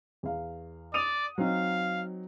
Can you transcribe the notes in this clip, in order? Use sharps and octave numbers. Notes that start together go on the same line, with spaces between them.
E2 F5
D5 D#6 D#7 F7
F#3 C4 D#4 F5